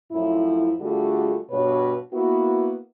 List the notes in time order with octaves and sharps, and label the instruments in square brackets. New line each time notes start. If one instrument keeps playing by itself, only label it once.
[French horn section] F#2 A2 F3 E4
D3 G3 A3 F4 F#4 G#4
G2 B2 F#4 B4 C#5
A#3 B3 E4 F#4